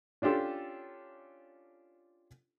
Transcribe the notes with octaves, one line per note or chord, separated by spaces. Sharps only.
C#4 D4 F4 G4 A4